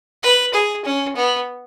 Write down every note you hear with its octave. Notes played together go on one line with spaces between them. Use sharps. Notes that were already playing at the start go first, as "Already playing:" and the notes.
B4
G#4
C#4
B3